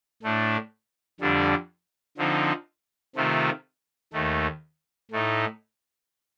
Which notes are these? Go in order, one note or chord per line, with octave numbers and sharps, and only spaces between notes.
A2 A3 D4
F2 D3 G3 D4
D3 F3 C4 D#4
C3 D#3 A3 C4 F4
D#2 D#3 A3
A2 A3 D#4